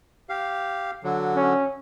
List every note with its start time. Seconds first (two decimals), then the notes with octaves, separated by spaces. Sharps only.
0.29 G4 F5
1.04 D3 F#3
1.36 C#4